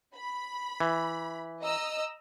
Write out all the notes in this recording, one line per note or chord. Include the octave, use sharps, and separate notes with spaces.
B5
E3
D#5 A#5 E6